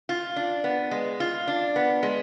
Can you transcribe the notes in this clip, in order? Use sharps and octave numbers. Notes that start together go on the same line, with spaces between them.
F4
D4
B3
G#3
F4
D4
B3
G#3